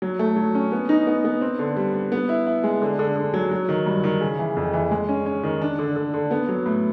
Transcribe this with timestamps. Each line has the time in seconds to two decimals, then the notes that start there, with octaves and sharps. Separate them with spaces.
0.02 F#3
0.19 A3
0.36 F#3
0.55 C#4
0.72 B3
0.89 D#4
1.07 B3
1.25 B3
1.41 C4
1.59 D3
1.77 G3
1.94 G3
2.12 B3
2.29 E4
2.47 E4
2.64 G#3
2.82 D3
2.99 D3
3.16 D3
3.34 F#3
3.51 F#3
3.69 D#3
3.86 G2
4.04 D#3
4.21 C#3
4.39 E3
4.57 F2
4.73 E3
4.91 G#3
5.09 C#4
5.26 C#4
5.44 D#3
5.62 D4
5.79 D3
5.96 D3
6.14 D3
6.31 B3
6.49 F#3
6.66 A2